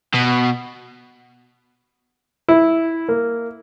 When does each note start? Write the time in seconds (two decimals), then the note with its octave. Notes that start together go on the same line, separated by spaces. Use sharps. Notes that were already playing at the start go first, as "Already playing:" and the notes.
0.14 B2
2.48 E4
3.09 A#3